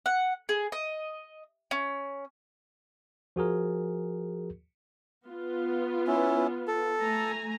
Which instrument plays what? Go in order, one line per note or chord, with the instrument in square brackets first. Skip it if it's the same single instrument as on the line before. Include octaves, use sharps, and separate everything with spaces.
[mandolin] F#5
G#4
D#5
C#4
[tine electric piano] F3 F#4 G#4 A#4
[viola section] B3 F4
[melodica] C#4 E4
A4
[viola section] A3 G#5 A#5